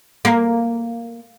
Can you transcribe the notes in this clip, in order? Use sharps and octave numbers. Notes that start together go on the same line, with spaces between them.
A#3